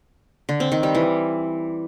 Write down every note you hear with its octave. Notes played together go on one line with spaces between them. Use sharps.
D3
C4
D#3
G3
E3